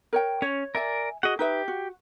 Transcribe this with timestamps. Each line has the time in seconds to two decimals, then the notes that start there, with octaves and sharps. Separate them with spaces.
0.13 A#4 C#5 G5
0.42 C#4 C#5
0.75 A#4 D5 E5 G#5
1.23 F#4 G#4 D#5 F#5
1.39 D#4 G4 B4 E5
1.68 F#4